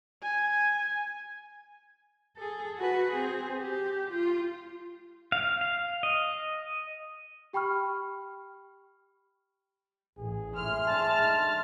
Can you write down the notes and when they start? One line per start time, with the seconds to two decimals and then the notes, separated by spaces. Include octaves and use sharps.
0.23 G#5
2.36 G#4 A4
2.78 F#4 B4
3.12 C4 G#4
3.58 G4
4.11 F4
5.32 F5
5.61 F5
6.03 D#5
7.53 G4 G5 B5 C#6 F6
10.18 A1 G#4
10.57 A2 E4 C6 F6
10.86 A3 C4 D4 A5
11.23 D#4